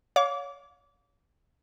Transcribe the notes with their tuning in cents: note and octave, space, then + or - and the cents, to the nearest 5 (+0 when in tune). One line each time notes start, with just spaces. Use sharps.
C#5 +20 F5 +30 D6 -25